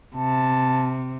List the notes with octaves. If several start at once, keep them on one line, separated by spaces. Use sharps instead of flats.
C3 A5